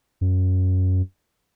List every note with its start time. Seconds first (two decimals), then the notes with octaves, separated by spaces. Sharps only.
0.21 F#2